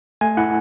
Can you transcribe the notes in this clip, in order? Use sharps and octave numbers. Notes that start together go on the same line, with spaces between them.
A3 G#5
E4 F#5